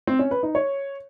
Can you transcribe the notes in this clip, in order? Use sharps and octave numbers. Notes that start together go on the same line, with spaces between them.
C4
C#4
B4
D#4
C#5